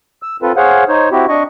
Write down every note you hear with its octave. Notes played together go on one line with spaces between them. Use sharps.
E6
C4 F4 A4 B4
G#4 C5 C#5 F5 F#5
D#4 C5 C#5
C4 E4 F#4 G4
D4 D#5 C#6